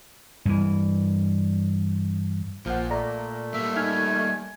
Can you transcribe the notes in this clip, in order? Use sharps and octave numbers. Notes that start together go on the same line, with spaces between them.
G2 E3
A#1 A#2 F3 F#5
A3 D5 A#5
G3 A#3 E5
D#4 G#5 F6 G#6